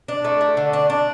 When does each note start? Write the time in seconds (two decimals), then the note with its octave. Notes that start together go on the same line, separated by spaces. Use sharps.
0.08 D4
0.24 A3
0.41 A3
0.57 D3
0.73 D4
0.90 D4